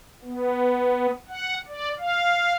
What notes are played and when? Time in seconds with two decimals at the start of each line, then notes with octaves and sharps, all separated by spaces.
0.24 B3
1.29 F#5
1.68 D5
1.99 F5